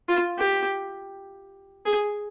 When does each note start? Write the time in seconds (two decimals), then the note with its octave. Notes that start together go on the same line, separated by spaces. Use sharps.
0.09 F4
0.38 G4
1.85 G#4